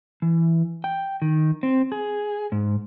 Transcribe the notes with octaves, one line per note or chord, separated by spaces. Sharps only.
E3
G5
D#3
C4
G#4
G#2